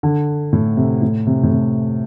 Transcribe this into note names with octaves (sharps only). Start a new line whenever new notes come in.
D3
A2
C3
A2
C3
A2
C3